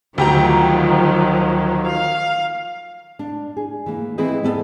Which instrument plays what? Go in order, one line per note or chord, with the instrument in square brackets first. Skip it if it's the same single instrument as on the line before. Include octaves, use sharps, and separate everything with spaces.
[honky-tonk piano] D2 G4 A#5 [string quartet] D#3 F3 F#3
[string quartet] F5
[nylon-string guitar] D4
G#4
E3 A#3
E3 C4 E4 G#4 B4 D#5
D2 B3 A4